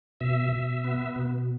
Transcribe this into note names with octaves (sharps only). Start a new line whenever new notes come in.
B2 E5
B2
B3
B2